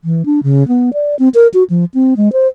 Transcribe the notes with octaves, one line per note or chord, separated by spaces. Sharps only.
E3
D4
C#3
B3
D5
C4
A#4
F#4
F3
C4
G#3
C5